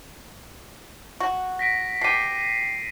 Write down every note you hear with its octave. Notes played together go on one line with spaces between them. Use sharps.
F#4
A#6 B6 D7
B2 G4 C7 D#7